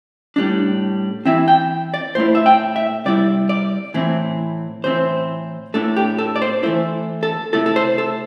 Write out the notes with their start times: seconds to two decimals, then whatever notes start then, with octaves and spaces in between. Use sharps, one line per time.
0.36 A2 G3 D4
1.25 E3 C4 E4 E5
1.48 G5
1.94 D5
2.15 A2 A3 E4 C5
2.35 E5
2.46 G5
2.76 E5
3.05 C3 G3 E4 D5
3.49 D5
3.94 A2 E3 C4 E4
4.84 A2 E3 C4 E4 C5
5.74 A2 A3 D4 A4
5.96 G4
6.19 A4
6.36 D5
6.42 C5
6.63 E3 A3 E4 C5
7.23 A4
7.53 C3 A3 E4 A4
7.66 A4
7.76 C5
7.98 A4